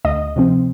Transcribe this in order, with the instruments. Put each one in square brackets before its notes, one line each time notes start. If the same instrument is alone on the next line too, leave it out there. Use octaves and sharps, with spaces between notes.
[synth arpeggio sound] D2 D#5
C3 F3 C4